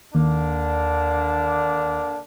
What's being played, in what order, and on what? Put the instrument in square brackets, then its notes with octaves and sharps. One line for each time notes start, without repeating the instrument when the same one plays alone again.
[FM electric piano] D#2 [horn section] D3 A#3 D4